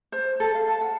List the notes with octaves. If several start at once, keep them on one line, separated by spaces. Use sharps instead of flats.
C5
A4
F5
A5
F#5